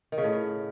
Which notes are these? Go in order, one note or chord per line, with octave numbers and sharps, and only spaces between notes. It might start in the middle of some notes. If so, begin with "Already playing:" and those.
D#3
C#3
A2